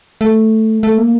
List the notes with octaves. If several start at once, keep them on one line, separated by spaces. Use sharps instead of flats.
A3
A3
A#3